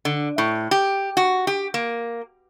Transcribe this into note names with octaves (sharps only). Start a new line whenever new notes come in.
D3
A2
G4
F#4
G4
A#3